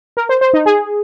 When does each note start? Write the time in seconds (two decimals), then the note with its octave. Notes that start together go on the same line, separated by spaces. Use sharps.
0.17 A#4
0.29 C5
0.41 C5
0.53 D#4
0.66 G#4